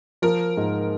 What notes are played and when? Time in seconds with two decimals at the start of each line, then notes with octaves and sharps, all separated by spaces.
0.22 F3 A#4
0.57 G#2